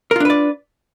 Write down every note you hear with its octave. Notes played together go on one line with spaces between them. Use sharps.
D4 F4 A#4 B4 D5